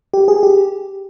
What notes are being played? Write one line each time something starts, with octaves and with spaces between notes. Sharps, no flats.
G4
G#4
G4